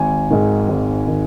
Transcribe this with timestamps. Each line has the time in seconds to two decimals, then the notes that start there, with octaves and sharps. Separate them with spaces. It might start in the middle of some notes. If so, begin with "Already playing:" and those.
Already playing: G#1 G#5
0.31 G#2 D#3
0.68 G#1
1.08 D#3